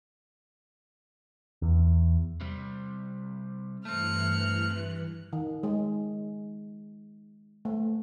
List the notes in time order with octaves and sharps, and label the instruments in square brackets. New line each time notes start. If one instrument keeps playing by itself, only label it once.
[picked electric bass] E2
[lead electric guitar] C3 G3
[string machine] G2 E3 F#6 [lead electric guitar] A3 C4 [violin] F6 C#7
[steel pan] D#3
G#3
A3